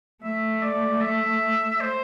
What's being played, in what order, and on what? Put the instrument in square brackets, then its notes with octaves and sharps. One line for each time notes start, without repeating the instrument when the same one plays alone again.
[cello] A3 [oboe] E5
[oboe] D5
E5
C5